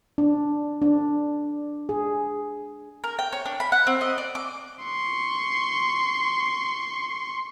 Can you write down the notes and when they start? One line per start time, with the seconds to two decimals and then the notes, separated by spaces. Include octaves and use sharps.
0.18 D4
0.82 D4
1.89 G#4
3.04 A#4
3.19 G5
3.33 C#5
3.45 D4
3.60 B5
3.72 F#5
3.87 C4
4.01 D#5
4.18 D5
4.35 D6
4.84 C6 C#6